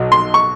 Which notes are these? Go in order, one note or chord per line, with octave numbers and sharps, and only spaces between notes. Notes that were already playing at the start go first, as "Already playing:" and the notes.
Already playing: B1 F#3
C6
C#6